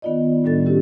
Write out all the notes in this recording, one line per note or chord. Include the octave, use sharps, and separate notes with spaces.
D#3 B3 D#4 F4 D5 D#5
A2 D#3 G3 D4 A4 A6
C#4 E4 F#4 G4 A4